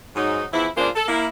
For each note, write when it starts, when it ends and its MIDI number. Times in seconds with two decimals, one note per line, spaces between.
0.16 0.45 44
0.16 0.45 54
0.16 0.45 63
0.52 0.67 40
0.52 0.67 52
0.52 0.67 53
0.52 0.67 64
0.77 0.89 49
0.77 0.89 56
0.77 0.89 58
0.77 0.89 62
0.77 0.89 65
0.77 0.89 72
0.96 1.06 69
1.08 1.26 58
1.08 1.26 64